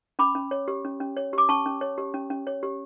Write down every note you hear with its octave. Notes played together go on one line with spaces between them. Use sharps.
C#4 B5 D6
C#4
C#5
G4
C#4
C#4
C#5
G4 D6
C#4 A5 C#6
C#4
C#5
G4
C#4
C#4
C#5
G4